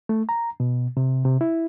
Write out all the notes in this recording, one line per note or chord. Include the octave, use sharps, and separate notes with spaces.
A3
A#5
B2
C3
C3
E4